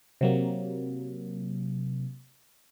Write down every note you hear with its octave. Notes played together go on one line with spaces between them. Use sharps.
C3 F#3 A#3